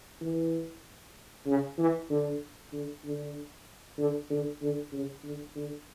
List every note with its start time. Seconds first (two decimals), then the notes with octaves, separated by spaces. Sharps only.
0.21 E3
1.46 C#3
1.78 E3
2.10 D3
2.72 D3
3.04 D3
3.98 D3
4.30 D3
4.61 D3
4.93 C#3
5.24 D3
5.56 D3